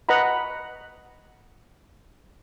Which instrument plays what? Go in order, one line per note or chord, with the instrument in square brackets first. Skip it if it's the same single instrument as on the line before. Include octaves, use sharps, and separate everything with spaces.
[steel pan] B4 D#5 F#5 A#5 B5